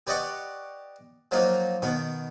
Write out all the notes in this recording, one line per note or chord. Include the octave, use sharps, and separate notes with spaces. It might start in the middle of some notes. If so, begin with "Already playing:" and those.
G4 B4 D5 D#5 F#5 C#6
F3 F#3 A#3 D#4 F4
B2 D#3 B3